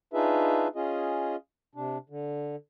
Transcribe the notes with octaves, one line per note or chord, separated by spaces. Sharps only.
D4 D#4 F4 G#4 B4 E5
C#4 F4 G#4 D#5
C3 D4
D3